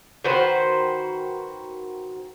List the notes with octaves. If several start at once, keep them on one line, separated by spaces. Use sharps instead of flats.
D#3 F#4 B4 C5